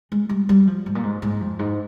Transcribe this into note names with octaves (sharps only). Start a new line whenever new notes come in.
G#3
G3
G3
F3
G#2
A#2
G#2
G#2
F2
G#2